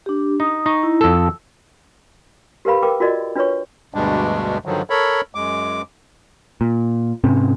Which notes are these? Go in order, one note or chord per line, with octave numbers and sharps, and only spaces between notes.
D4 G4
D#4 D#6
D#4 C#6
E4
F2 A4 E6
G4 A#4 B4 F5 B5
A#4 B4 G5 D6
F4 F#4 A#4 D5 D#5
D4 F4 B4 C#5 C#6
D2 G2 B2 G3 G#3 D4
G2 D3 D#3 F3 F#3
A4 A#4 C#5 B5
F#2 G#3 D6
A#2
G#2 C3 C4 C#4